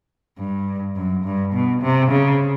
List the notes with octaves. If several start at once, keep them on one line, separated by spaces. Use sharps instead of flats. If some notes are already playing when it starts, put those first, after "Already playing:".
G2
F#2
G2
B2
C3
C#3